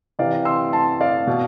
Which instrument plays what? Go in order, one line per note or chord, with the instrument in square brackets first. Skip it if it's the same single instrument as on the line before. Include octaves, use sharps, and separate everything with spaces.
[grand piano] C3 E3 D5 F5
C6 E6
A5 C6
D5 F5
B2